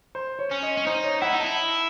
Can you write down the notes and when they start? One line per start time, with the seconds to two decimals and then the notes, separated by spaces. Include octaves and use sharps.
0.15 C5
0.39 C#5
0.51 C#4
0.63 D#5
0.77 C#4
0.87 D#4 C5
1.04 C#5
1.22 E4 F#5
1.33 D#4
1.40 E4 A5